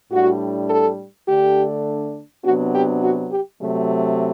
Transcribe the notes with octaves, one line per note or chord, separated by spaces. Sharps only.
A2 G3 D4 F#4
A4
D3 A3 D4 G4
C3 F#3 B3 D4 F#4
G4
F#4
G4
C3 F#3 A3